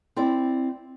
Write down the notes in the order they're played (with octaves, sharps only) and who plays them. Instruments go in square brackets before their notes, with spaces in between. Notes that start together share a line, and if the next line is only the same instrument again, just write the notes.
[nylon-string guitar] C4 E4 D5